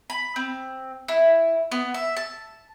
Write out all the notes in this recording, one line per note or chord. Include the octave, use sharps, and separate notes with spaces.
B5
C4
E4
B3
E5
A5